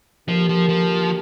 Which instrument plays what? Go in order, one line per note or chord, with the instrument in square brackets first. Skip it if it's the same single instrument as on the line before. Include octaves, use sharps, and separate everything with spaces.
[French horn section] D3 A#3 G4 A#4 [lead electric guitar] F3
[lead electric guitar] F3
F3